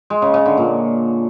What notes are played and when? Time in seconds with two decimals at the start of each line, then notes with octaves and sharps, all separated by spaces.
0.10 G#3
0.22 C#3
0.34 C#3
0.46 D3
0.57 A#2